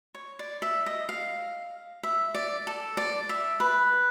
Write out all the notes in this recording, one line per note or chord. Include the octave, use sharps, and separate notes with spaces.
C#5
D5
E5
D#5
F5
E5
D5
A4
D5
E5
B4